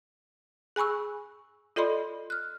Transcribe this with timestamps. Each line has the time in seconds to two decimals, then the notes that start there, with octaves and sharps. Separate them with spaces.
0.76 G#4 G#5 B5 C#6 E6
1.76 F4 A4 D5 D#5 B5 C6
2.30 F6 F#6